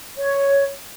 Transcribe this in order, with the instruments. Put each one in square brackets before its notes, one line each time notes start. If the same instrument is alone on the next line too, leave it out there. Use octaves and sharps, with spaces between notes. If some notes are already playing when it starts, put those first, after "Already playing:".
[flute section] C#5